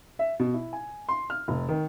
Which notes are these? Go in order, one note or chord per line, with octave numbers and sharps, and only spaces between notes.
E5
B2
E4
G#5
C6
F6
F1
D#3